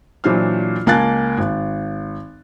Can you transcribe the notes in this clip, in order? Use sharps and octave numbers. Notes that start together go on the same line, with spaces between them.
A#2 E3 F#3 D4 C5 F6
C#2 A#3 G#5 A5 F#6 A6
G#1